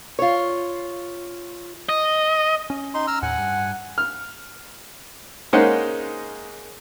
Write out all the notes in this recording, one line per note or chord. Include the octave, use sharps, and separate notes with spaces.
F4 C#5
D#5
C#4
D#4 C6
A#5 E6 F6
D#2 A2 F#5 G#5
G2
F6
G#3 A#3 C#4 D#4 C5 F#5